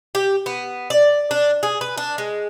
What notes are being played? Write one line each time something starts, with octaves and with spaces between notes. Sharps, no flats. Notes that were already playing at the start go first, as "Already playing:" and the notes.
G4
B3
D5
D4
G#4
B4
D4
G#3